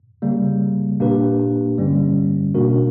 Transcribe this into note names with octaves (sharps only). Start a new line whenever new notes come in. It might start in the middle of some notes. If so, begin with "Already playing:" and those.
C#3 G3 A#3
A#2 A#3 D4 G4 B4
G2 D3 G3 C#4
B2 A#3 D4 F#4 A#4